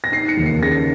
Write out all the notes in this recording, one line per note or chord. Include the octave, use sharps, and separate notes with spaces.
A#6
D#4 C7
C#7
D#2
C7
C#3 A#6